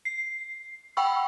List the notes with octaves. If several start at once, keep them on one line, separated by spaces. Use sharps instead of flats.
C7
F#5 G5 B5 C#6 E6